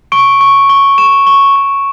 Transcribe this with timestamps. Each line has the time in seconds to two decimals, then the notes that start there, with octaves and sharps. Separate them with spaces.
0.12 C#6 D7
0.41 C#6
0.70 C#6
0.98 C#6 E7
1.27 C#6
1.56 C#6